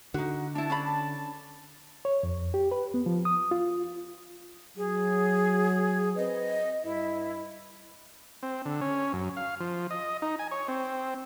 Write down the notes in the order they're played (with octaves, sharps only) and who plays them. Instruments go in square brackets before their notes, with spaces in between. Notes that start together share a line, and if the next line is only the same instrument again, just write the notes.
[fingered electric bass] D3 [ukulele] D#4 F#4
[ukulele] D4 E4 [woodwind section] A5
[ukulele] C#4 D4 B5
[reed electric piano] C#5
F2
G4
B4
B3
F3
D#6
F4
[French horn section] F#3 [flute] G#4
[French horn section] C4 B4 [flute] D#5
[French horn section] G2 D#5 [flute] E4
[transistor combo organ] C4
D3
C#4
F#2
F5
F3
D#5
D#4
G#5
C#5
C4